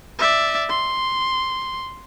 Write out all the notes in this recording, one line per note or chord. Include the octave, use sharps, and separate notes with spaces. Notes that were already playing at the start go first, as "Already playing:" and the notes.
D5 E5
C6